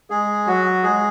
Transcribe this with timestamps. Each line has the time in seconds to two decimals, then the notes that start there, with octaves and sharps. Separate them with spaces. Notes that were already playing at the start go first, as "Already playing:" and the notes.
0.10 G#3 G#4
0.47 F#3 F#4
0.83 G#3 G#4